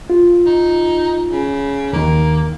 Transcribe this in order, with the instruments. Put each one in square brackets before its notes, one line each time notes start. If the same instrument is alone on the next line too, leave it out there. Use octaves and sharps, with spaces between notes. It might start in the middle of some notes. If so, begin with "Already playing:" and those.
[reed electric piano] F4
[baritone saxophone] D#4
C#3
[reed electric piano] D#2 D#3 [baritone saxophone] A#3